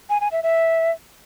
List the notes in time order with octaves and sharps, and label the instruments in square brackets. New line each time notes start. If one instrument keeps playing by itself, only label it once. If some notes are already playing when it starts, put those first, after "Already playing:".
[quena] G#5
G#5
E5
E5